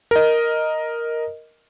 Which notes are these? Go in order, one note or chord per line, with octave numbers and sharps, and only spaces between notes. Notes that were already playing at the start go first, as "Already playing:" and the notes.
A#4 D#5